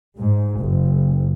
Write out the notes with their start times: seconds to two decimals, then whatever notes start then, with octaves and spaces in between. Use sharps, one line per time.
0.19 G#2
0.61 F#1